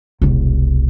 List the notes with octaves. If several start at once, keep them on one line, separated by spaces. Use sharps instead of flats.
E1 C2